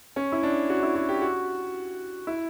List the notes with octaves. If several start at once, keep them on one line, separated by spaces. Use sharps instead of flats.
C#4
E4
D4
F#4
E4
F#4
G4
F#4
E4